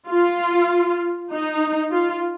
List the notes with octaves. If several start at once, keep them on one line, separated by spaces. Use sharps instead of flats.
F4
D#4
F4